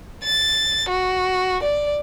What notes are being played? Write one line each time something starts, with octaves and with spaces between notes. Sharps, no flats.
A6
F#4
D5